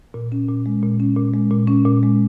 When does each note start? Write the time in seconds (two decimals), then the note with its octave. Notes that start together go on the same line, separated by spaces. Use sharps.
0.14 A#2
0.32 C#4
0.49 A#2
0.66 G#3
0.83 A#2
1.00 C#4
1.17 A#2
1.34 G#3
1.51 A#2
1.67 C#4
1.85 A#2
2.03 G#3